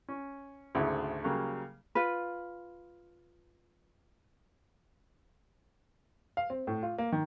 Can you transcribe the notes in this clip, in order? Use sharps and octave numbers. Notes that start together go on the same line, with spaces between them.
C#4
G#1 D2 C#3 E4 F#5
C#3 F#3 G3 A#3
F4 B4
F5
C4
A2
F4
A#3
D#3